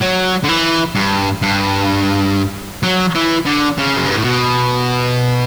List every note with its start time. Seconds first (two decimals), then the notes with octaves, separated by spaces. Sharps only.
0.01 F#3
0.44 D3
0.49 E3
0.96 G2
1.42 G2
2.83 F#3
3.15 E3
3.46 D3
3.78 C#3
3.97 F#2
4.06 G2
4.15 A2
4.25 B2